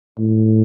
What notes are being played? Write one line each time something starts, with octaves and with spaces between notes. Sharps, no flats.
A2